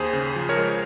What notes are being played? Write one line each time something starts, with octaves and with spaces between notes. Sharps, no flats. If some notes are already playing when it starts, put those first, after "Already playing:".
Already playing: D#2 G#4 C5
C#3
F3
A#4 C#5
G#3